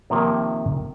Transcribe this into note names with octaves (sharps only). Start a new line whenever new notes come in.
C3 D#3 F3 A#3